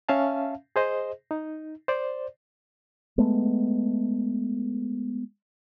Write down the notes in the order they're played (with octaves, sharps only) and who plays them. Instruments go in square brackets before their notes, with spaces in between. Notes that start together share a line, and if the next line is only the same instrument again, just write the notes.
[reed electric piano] C#4 E5 F5 A5
G#4 C5 D#5
D#4
C5 D5
[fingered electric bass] G#3 A3 B3